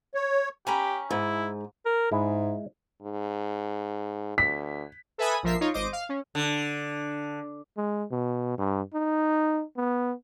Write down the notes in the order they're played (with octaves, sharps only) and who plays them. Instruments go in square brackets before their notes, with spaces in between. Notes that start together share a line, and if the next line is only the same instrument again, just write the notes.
[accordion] C#5
[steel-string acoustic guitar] C#4 [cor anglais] G4 [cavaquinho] G#5 A#5 B5
[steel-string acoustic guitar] G#2 [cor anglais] E4
[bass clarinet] A#4
[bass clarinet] G#2 [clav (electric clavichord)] G#3 E4
[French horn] G#2
[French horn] D2 [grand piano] B6
[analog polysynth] A4 B4 E5 G#5 B5 D#6
A#1 F3 A#4 E5 C7
D#4 F4 C#5
G#1 C5 D#5 D6
F5
C#4
[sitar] D3
[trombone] G#3
B2
G2
D#4
B3